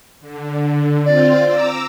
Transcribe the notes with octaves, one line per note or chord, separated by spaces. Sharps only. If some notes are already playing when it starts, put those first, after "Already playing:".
D3
C4 F4 C5 D5
A#5 D6 E6